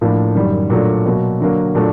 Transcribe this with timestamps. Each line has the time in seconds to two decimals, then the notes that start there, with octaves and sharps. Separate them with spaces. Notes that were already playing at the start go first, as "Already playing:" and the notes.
0.01 A2 F3 A#3 D4
0.35 F#2 D#3 G3
0.70 A#2 F#3 A3 D4
1.05 B2 F#3 A#3
1.40 D3 F#3 A#3
1.75 A#2 F#3 A3 D4